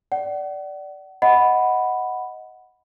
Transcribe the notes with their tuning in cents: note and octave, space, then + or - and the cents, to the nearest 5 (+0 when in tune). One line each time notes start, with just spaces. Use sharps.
D5 -5 F#5 +35
D#5 +15 F#5 +0 B5 +0